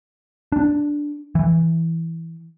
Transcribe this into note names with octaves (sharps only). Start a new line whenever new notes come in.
D4
E3